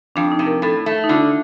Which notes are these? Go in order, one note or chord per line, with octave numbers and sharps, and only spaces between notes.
F2 D4
D#4
C3
A#4
A2 A4
A3
D#4
D3 F4